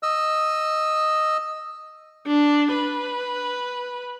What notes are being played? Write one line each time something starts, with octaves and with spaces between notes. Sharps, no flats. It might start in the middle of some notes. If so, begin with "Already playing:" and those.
D#5 E6
D4
B4